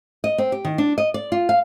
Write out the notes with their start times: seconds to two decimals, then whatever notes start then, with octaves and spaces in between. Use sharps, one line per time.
0.24 D#5
0.38 C4
0.52 G4
0.65 D#3
0.78 D4
0.98 D#5
1.14 D5
1.32 F4
1.49 F5